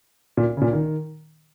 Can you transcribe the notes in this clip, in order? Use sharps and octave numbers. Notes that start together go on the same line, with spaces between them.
A#2
C#3
A#2
D#3